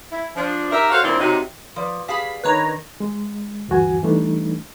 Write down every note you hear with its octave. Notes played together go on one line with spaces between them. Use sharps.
E4
F3 D4
D#4 G4 A#4 E5
F#4 A4 C5 C#5 F5
C#3 F3 A#3 C4 D4 E4
C3 F#3 D#4
F3 B4 D5
G4 G#4 F5 A5 B5 B6
D#3 D4 A#4 B4 C#5 A#5
G#3
D2 G2 E3 F#4 G#5
E3 G3 A3 D4 D#4